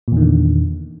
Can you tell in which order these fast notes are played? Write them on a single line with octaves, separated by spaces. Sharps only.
A#2 E2 D#3 D3